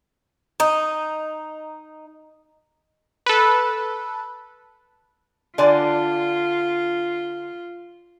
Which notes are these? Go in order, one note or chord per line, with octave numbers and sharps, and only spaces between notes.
D#4
A4 B4
D3 F4 D5 G#5